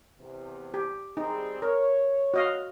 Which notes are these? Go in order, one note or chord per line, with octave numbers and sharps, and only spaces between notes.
E2 C3
G4
G3 C4 D#4 G#4
A#4 C#5
F#4 D#5 F5